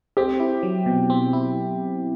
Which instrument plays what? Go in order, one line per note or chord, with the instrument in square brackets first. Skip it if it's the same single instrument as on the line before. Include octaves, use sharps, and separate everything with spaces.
[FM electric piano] C4 [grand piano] G4
[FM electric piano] E4
F#3
B2
C4
E4